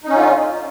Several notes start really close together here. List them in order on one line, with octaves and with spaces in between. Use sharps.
D#4 C#4 D3 F4